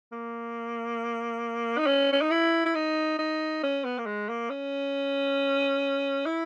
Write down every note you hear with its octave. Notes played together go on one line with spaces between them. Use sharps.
A#3
D#4
C#4
C#4
D#4
E4
E4
D#4
D#4
C#4
B3
A#3
G#3
A#3
C#4
E4